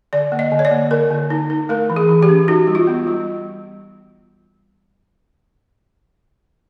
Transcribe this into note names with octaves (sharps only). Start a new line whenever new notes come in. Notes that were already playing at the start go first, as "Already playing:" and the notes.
D3 D5
A#3
D#5
D3
C#5
D5
A#3
D3 A#4
D3
D#4
D#4
A3 A#4
E3
G#4
E3
G4
C#4
D#4 F#4
G3
F4
B3
G3